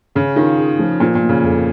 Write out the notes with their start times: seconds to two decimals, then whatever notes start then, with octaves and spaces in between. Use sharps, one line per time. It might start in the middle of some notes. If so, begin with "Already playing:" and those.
0.15 C#3 C#4
0.36 D#3 F4
0.57 G#4
0.79 F3
1.00 A#2 F3
1.15 A#2
1.22 A#3
1.29 C#3
1.43 F2